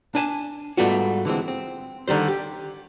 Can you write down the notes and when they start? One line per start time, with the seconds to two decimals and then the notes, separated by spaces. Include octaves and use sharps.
0.15 D4 G#5 A5
0.77 G#2 G3 A3 B3 F4 F#4
1.25 D3 E3 G#3 C4
1.48 C4
2.08 D3 D#3 G3 C5
2.28 G4